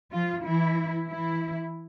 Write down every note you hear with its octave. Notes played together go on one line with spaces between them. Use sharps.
F3 F4
E3 E4
E3 E4